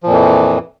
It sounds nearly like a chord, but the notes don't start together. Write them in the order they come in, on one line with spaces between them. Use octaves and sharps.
F3 A#2 F2 E3